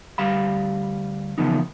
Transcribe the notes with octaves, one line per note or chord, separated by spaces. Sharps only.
D2 G3 F5 B5
C#3 E3 F3 A#3 B3 D#4